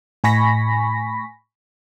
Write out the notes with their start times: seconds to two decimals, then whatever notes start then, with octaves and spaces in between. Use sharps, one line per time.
0.24 A2 G#5 B5 C#6 A#6 B6